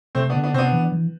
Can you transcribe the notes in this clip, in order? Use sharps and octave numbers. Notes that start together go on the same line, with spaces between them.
C3 A3 C4
B3 D4
D3
B3 D4
C3 B3 C4 D4
E3
E3